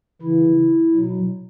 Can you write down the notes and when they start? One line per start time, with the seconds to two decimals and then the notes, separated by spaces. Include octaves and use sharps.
0.22 C#3 E3 E4
0.94 B2 F#3